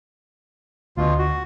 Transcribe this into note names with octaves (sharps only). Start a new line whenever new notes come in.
D2 B2 F4
F#4